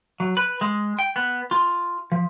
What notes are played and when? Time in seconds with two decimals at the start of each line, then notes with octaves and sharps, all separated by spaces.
0.20 F#3
0.37 B4
0.61 G#3
0.99 G5
1.16 B3
1.51 F4
2.12 F3